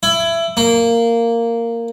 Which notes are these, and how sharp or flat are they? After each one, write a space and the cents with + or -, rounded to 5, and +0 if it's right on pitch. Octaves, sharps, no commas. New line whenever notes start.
E4 +20
A#3 -10